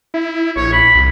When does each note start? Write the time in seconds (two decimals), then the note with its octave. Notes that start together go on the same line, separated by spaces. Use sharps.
0.14 E4
0.56 A#1 C#5
0.73 B5
0.96 C2